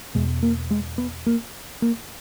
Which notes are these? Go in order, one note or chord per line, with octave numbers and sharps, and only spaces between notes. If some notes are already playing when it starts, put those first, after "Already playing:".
E2 B2 G#3
A#3
G#3
B3
A#3
A#3